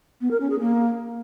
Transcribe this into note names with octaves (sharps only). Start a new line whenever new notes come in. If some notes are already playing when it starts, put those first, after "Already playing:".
B3
A#4
C#4
G#4
A#3